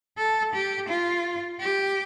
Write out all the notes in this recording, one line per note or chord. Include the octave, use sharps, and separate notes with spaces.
A4
G4
F4
G4